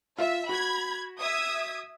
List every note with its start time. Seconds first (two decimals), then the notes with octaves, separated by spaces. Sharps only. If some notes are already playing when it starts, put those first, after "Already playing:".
0.18 F4 E5
0.49 F#4 B5 G#6
1.20 E5 D#6 G#6